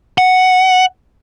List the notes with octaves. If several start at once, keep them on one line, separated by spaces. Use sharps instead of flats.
F#5